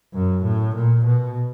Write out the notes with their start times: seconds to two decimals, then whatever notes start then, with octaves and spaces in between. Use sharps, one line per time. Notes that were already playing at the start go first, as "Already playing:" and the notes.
0.13 F#2
0.43 A2
0.74 A#2
1.05 B2